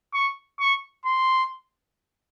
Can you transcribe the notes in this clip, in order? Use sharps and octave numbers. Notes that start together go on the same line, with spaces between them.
C#6
C#6
C6